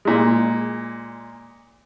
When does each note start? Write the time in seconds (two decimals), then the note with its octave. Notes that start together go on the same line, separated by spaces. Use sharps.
0.05 A#2 G#3